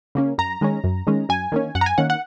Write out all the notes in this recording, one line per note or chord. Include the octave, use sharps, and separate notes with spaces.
C#3 A#3 C#4
F#2 A#5
D#3 G#3 C#4
F#2
D#3 G#3 C#4
F#2 G#5
D#3 A#3 C#4
F#2 F#5
A#5
G#5
D#3 A#3 C#4 F#5
F#5